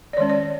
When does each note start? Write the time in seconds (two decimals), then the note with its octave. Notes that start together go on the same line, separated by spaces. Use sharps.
0.13 D5
0.17 D#3 G#3 C#4 C#5
0.30 D5